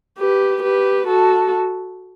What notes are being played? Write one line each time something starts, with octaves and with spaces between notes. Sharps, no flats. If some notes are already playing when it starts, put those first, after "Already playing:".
G4 B4
G4 B4
F#4 A4